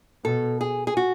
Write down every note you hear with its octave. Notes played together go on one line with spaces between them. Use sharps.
B2 A4
G#4
G#4
F#4